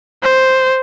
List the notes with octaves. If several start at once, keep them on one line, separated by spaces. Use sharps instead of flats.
C5